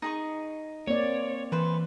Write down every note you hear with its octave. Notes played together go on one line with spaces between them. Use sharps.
D#4 G#4 C#6
A#3 C4 C#5 D5
E3 B4 C5